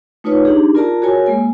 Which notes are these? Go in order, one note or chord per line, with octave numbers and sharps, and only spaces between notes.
A3 D#4 F4 B4 C#5
D4 D#4 G4 G#4
F4 A#4 D5 A5 A#5
F#4 G#4 A#4 C#5 G#5
G#3 A#3 G#5